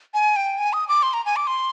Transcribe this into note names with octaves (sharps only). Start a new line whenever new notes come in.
G#5
G5
G#5
D#6
D6
C6
A#5
G#5
D6
C6